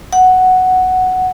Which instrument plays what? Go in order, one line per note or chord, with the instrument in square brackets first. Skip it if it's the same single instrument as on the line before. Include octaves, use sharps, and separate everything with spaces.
[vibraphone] F#5